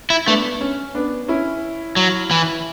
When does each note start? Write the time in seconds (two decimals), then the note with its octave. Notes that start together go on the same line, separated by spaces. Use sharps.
0.10 E4
0.27 A3 B3 D4
0.61 C#4
0.95 B3 D4
1.28 C#4 E4
1.96 F#3
2.31 E3